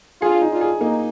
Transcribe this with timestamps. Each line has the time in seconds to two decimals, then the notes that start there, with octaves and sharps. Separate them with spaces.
0.21 D4 F4 G#4
0.42 D#4
0.52 D4 F4
0.61 G#4
0.80 A#3 D#4